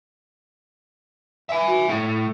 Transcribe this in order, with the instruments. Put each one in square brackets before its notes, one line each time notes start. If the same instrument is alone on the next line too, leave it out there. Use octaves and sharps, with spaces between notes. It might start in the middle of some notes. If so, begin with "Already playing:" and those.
[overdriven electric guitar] E5 G#5
[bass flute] F#4
[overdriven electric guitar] A2 A3 [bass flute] A4